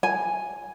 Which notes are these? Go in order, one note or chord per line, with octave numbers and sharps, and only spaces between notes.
G#5